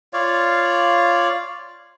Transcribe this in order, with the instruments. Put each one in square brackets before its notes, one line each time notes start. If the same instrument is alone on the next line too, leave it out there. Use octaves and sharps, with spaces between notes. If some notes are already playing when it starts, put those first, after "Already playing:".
[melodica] F4 C#5 D5 F5